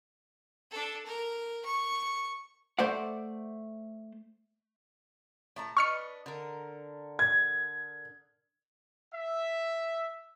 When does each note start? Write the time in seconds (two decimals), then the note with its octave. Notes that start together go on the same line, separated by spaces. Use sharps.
0.71 D4 A4
1.06 A#4
1.66 C#6
2.79 A3 C5 D5 F#5
5.56 A2 A5 A#5
5.77 D4 B4 D#5 C#6 F6 C#7
6.26 D3 A#4
7.19 G#6
9.14 E5